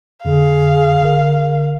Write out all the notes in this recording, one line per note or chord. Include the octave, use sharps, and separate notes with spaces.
F2 D3 G#4 F5
G1 D3 A#4